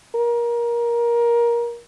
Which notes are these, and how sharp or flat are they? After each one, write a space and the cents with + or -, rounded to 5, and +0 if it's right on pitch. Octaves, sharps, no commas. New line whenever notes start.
A#4 +20